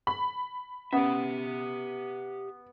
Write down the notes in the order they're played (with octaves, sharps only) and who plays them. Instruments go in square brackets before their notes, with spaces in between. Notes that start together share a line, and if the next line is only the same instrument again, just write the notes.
[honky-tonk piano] B5
[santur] B3 [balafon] C#4 [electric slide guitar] G4 E5